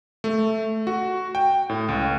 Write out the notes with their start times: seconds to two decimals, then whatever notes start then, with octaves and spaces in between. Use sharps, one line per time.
0.24 A3
0.87 F#4
1.35 G5
1.69 A2
1.89 C#2